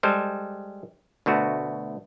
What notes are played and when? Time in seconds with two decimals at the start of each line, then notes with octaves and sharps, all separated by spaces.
0.03 G3 G#3 A4 C5
1.26 D2 B2 A3 F#4